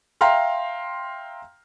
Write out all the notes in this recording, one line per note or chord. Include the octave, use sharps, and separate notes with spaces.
E5 F5 G5 A#5 C6 F6